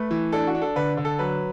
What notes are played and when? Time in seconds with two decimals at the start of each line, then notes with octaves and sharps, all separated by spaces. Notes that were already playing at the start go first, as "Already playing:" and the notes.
Already playing: A3 B4
0.11 E3
0.32 D4 A4
0.47 F#4
0.55 D4
0.62 A4
0.76 D3 B4
0.97 D3
1.05 A4
1.19 F#3 B4